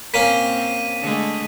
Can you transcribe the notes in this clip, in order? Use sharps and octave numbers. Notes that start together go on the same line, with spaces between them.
A#2 A#3 C4 C#4 B6 D#7
D3 G#3 A3